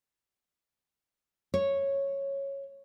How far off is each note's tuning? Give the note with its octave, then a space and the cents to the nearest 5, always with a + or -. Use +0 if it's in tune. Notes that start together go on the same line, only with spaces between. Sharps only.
C#5 -10